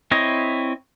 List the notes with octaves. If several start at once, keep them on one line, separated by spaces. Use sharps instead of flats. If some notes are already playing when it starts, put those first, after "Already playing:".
C4 E4 C#5 D#5